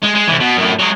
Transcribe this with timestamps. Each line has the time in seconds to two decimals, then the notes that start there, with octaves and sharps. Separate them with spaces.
0.03 G#3
0.15 G#3
0.28 C2 E3
0.40 B2
0.57 F#2 A2
0.79 F#3 G#3